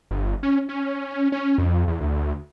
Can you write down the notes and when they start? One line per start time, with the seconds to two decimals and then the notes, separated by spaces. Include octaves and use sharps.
0.11 G1
0.43 C#4
0.69 C#4
1.32 C#4
1.58 F2
1.88 E2
2.01 D2